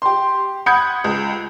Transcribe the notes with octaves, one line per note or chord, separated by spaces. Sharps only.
G4 C6
F#5 B5 D#6 G6 G#6 C#7
C#2